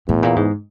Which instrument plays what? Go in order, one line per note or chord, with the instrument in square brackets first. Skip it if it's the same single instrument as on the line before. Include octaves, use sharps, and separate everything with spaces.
[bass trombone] E2 [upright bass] A2
[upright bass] A#2
G#2